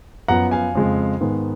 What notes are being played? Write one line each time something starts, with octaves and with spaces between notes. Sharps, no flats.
F#2 F3 B3 F#5 A#5
F5 G#5
F2 C#3 G#3
G#2 D#3 G#3 B3